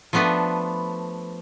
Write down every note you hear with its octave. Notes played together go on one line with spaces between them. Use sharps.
F3 A3 B3 D4 B4